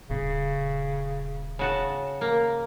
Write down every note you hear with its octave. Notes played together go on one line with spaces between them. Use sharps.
D#1 C#3
C#3 F#4 A5
A#3 A#4